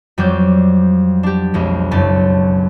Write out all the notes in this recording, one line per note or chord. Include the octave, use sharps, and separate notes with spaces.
F2 F#3 G3 D5 G6
D4 G4
B1 F2 G#3
F#1 F#2 A5